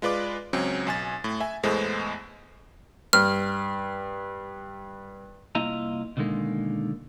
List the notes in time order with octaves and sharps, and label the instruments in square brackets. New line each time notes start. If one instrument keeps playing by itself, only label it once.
[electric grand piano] G#3 F4 B4 D5 D6
C#2 F#3 C4 C#4
B1 G#5 A6
A2
E5 G#5
E2 A2 G#3 B3 A4 C5
[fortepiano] G2 [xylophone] F6
[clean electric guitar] C2 A#3 E4 F4 D#5 A#5
B2 D3 D#3 G#3 A#3